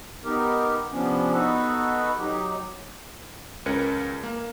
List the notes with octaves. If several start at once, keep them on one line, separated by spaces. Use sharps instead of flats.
B3 D#4 G4 A#4
C3 F3 B3 C#4 D4
B3 D#4 F#4 A4 B4
F#3 D#4 G4
C#2 C#4 A#4 B4 C#7
A#3